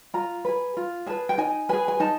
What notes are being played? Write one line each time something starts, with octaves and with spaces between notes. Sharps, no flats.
F4 A#5
G#4 B4
F4
G#4 B4 A5
G5
D#4 G#5
G#4 B4 G#5
G#5
D#4 A5